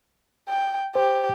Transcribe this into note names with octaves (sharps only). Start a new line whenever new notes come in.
G5
G4 C5